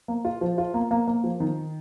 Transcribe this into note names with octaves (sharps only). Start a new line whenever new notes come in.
A#3
F4
F3
F4
A#3
A#3
A#3
F3
D#3